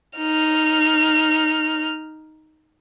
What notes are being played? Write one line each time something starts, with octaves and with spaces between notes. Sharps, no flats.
D#4 F6